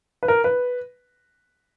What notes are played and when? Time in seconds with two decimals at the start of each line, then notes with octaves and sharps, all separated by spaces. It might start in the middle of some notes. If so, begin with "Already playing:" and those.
0.23 B4
0.28 A#4
0.44 B4